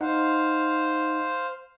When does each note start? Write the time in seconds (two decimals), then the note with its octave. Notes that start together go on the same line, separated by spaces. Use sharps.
0.01 D#4 C5 F5 F#5